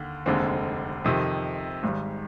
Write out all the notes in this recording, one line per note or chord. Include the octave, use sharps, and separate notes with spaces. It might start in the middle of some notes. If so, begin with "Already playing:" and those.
Already playing: D#2 D3
F1 D#2 D3 G#3 C4
F2 C3 D#3
G#1 G#2 G3